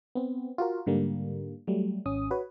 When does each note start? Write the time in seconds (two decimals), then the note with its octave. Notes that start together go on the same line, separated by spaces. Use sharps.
0.15 B3 C4
0.58 F4 F#4 A#4
0.86 G#2 D3 G3 A#3
1.67 F#3 G3 A3
2.06 G#1 C#4 D#6
2.31 F#4 B4 C#5